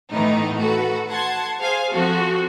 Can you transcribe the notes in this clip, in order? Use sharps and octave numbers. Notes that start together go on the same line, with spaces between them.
A2 D#3 E3 A3 B3 D#4
F#4 A4 B4
F#5 A5 C6 G#6
G#4 C5 F5 G#5
F3 C4 F#4 A4